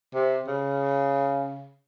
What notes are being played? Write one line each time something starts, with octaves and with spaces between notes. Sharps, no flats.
C3
C#3